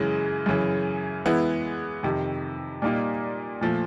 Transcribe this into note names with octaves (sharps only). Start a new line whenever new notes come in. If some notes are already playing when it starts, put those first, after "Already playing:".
Already playing: F#2 C#3 E3 G#3
F#2 C#3 E3
E3 G#3 B3 E4
F2 C3 D#3
A#2 G3 A#3 D#4
A#2 F3 A3